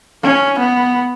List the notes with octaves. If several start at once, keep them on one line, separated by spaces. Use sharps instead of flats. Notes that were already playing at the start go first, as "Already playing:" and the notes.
C#4
B3